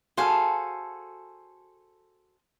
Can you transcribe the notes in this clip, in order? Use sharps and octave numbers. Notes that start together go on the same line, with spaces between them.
F#4 G#4 A4 C5 F5 G#5